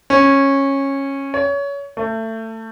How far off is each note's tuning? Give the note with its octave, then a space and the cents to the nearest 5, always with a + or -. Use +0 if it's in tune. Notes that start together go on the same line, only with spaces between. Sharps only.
C#4 -15
C#5 +25
A3 +25